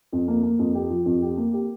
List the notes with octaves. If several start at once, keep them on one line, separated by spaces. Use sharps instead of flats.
F2
A#3
A#3
F2
G4
F3
F2
G4
A#3
G4